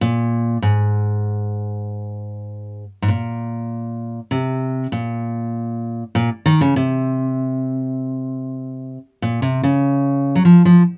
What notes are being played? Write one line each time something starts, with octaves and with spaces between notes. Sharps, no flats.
A#2
G#2
G#2
A#2
C3
A#2
A#2
D#3
C#3
C3
A#2
C3
C#3
F#3
F3
F3